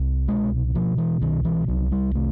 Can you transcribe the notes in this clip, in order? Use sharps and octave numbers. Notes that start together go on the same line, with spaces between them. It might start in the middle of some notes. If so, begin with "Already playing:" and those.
Already playing: C2
B2 G#3
B2 F3
E3
C2 D#3
E3
C2 F#3
G3
C3 A3